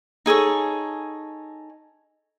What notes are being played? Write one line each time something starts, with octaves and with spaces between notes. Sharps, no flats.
D#4 G#4 A4 C#5